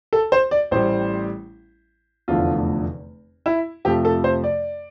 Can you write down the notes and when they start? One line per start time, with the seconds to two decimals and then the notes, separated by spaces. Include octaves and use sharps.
0.13 A4
0.32 C5
0.51 D5
0.71 A1 A2 G3 C5
2.28 F1 E2 D3 F3 A3 F4
3.46 E4
3.85 F2 C3 F3 A3 G4
4.05 A4
4.24 C5
4.44 D5